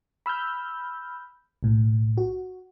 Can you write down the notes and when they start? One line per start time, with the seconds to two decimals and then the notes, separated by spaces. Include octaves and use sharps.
0.26 B5 E6 F6 G6
1.63 B1 A2
2.18 F#4